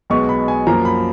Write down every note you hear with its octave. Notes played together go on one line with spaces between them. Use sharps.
B1 B2 G#3 B3 C#6
B5
G#5
F#2 F3 A#3 A#5
B5